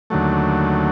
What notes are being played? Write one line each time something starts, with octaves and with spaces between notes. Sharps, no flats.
D#2 D3 F#3 A3